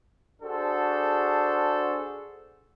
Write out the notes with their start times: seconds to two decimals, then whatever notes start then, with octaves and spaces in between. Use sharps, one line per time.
0.42 D4 F#4 G#4 A4 C5